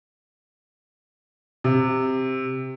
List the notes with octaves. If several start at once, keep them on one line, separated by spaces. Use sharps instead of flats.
C3